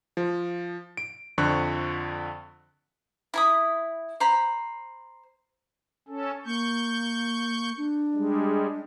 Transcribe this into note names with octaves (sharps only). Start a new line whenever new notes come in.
F3
D7
F2 D3 F3 C#6 F#6
E4 B5 D#6
C5 A#5 B5
C#4 A4
A#3 C#6 G6
D4
G3 G#3